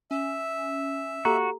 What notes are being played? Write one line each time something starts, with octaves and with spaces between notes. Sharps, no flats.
C#4 E5
A#3 F#4 G4 A4 A#5